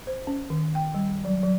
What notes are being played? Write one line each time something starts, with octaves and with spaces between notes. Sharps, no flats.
C5
C#4
D#3
G5
G3
F#3
F#3